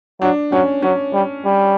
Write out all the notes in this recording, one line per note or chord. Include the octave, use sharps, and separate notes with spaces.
F#3 D4
F#3 C#4
F#3 C#4
G3
G3